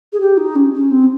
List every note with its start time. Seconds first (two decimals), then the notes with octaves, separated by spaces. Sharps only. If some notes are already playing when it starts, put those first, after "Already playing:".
0.13 G#4
0.20 G4
0.37 D#4
0.55 C#4
0.73 C#4
0.91 C4